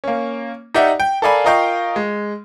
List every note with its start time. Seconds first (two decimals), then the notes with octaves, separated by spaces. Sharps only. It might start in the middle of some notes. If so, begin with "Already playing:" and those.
0.04 A#3 C#4
0.74 D#4 G4 D5 E5 F#5
1.00 G5
1.22 A4 A#4 D5 F5 G#5 B5
1.44 F4 A#4 D#5 F5 G5 C#6
1.96 G#3